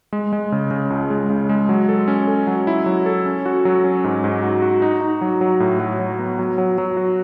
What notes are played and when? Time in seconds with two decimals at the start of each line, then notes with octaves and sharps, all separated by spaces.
0.13 G#3
0.33 G#3
0.52 C#3
0.71 C#3
0.90 C#2
1.10 G#3
1.30 C#3
1.49 G#3
1.69 F#3
1.89 A4
2.08 C#4
2.28 A4
2.47 F#3
2.67 E4
2.86 F#3
3.06 A4
3.26 C#4
3.46 F#4
3.65 F#3
3.84 C#4
4.04 G#2
4.24 G#2
4.43 F#4
4.62 F#4
4.82 D#4
5.01 D#4
5.21 F#3
5.41 F#3
5.60 A2
5.80 F#3
5.99 F#3
6.19 B3
6.39 F#3
6.58 F#3
6.78 F#3
6.97 F#4